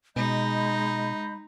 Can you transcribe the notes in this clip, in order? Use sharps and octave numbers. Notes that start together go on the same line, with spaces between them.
B2 G#3 D#4 D#5 B5 G6